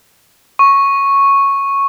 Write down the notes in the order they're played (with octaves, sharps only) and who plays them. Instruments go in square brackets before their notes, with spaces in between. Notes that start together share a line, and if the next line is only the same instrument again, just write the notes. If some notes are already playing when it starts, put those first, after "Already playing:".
[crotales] C#6